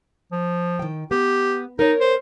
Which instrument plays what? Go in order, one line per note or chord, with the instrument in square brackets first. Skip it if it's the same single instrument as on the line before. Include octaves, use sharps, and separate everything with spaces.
[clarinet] F3
[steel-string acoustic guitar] D#3 G5
[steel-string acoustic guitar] B3 [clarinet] G4
[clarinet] D#4 [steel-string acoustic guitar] A#4 C#5
[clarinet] C5